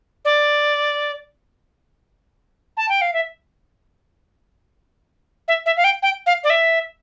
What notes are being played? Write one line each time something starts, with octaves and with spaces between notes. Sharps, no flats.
D5
A5
G5
F5
E5
E5
E5
F5
G5
G5
F5
D5
E5